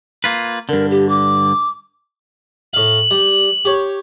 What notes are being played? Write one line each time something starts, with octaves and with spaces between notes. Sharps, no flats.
A#3 F4 B4
G2 D3 A#4
G4
D6
A2 F5 F#7
G3
G4 C#5